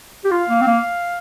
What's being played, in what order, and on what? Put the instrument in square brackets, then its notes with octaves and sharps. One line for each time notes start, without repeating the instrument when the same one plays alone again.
[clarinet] G4
[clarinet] F4 [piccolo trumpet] F5
[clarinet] A#3
C4
A#3